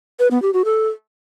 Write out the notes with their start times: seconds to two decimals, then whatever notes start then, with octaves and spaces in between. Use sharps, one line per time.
0.20 B4
0.31 B3
0.42 G4
0.54 F#4
0.65 A4